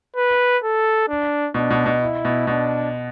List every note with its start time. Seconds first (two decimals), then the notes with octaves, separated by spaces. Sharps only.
0.16 B4
0.63 A4
1.09 D4
1.54 B2 D4
1.71 B2
1.86 B2
2.02 E4
2.25 B2
2.47 B2 D4